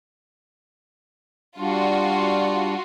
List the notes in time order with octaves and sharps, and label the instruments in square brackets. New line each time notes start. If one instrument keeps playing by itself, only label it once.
[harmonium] G3 D4 [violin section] F4 F#4